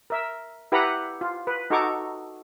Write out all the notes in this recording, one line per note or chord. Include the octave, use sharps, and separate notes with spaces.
A#4 E5
E4 G4 B4 F#5 A#5 B5
F4
B4
D#4 F#4 A4 A#5 C#6 D6